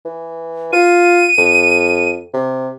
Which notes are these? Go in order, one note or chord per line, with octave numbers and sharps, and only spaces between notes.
E3
F4 D#7
F2
C3